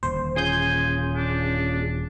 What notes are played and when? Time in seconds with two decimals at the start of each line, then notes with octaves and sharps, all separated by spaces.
0.03 D#1 A#2 D3 C5
0.36 C#4 F4 G#4 G#5 C6 D#6 G6
1.16 D4